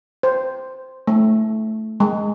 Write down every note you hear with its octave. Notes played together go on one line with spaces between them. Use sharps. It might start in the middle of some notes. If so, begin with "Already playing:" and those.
C5
A3
G#3